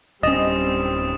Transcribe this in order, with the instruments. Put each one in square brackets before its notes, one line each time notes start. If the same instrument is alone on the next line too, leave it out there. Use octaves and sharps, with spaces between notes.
[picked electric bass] D1 C#4 [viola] G3 C4 [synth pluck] D#5 [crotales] D#6 A6 E7